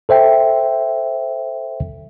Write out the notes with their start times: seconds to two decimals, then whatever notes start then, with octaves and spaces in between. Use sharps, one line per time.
0.09 A4 C5 E5 G5